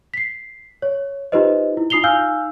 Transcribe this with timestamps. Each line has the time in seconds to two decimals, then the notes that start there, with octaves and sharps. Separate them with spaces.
0.14 B6 C7
0.82 C#5
1.32 D#4 F4 G4 B4 C5 D#5
1.77 E4
1.90 D#4 F4 D#6 C7 F7 G7
2.03 D#4 F5 G#5 E6 F6 G6